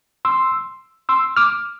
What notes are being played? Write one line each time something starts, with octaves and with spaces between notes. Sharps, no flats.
C6 E6
C6 E6
D6 F6